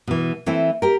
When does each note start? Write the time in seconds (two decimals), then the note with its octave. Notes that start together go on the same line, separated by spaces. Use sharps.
0.07 B2 E3
0.46 E3 A3 C4 E4
0.82 G4 A#4